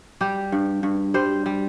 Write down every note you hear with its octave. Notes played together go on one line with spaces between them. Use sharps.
G3 G4
G2
G2
G3 C5
G3